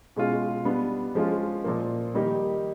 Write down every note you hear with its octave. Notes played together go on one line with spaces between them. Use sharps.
B2 G#3 C#4 F4 G#4
G3 B3 D4
F3 G#3 C#4 F4
A#2 F3 A#3
D#3 G3 A#3 D#4 G4